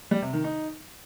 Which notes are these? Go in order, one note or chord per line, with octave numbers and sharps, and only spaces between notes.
G3
C3
D#3
D#4